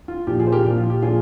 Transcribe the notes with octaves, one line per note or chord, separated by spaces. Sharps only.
F4
A#2 F3 G4
F4 G#4
C5
G4 A#4
A#2 F3
F4
G4
A#2 F3 F4 G#4